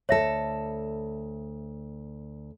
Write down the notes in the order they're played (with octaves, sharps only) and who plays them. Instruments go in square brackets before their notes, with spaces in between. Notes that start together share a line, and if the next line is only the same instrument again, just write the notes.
[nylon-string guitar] D2 A4 [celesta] C#5 E5 A#6